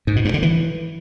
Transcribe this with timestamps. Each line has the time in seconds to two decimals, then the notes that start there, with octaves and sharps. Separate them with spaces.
0.07 G#2
0.16 B2
0.25 G2
0.34 D3
0.43 E3